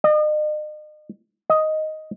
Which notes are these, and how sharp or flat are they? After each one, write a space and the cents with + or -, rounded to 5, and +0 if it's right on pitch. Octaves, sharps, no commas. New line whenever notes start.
D#5 -40
D#5 +5